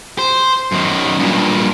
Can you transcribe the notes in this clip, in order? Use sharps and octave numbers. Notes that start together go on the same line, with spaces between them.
C5
F#2 D#3
G2 A#2